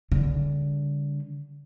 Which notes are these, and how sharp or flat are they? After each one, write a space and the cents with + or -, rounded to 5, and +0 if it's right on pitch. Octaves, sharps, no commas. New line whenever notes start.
D3 -30 G3 +40